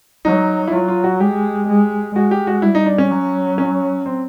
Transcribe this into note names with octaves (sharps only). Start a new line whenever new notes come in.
F#3 D#4
E4
F#3 F4
F4
F#4
G#3 G4
G#3
G#3 F#4
G4
F#4
G3 E4
D#4
D4
C#4
F#3
C#4
C4